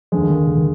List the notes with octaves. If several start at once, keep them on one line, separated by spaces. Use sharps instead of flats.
D#2 D3 F3 G#3
D#3
D3
D#3